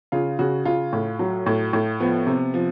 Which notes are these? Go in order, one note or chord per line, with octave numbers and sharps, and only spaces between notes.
C#3 F4
C#3 F#4
C#3 F4
A2
F#3
A2
A2
F3 B3
C3
F3